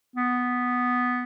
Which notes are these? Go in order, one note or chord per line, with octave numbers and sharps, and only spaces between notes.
B3